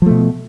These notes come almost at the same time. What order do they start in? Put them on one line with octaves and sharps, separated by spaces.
F3 A3 B2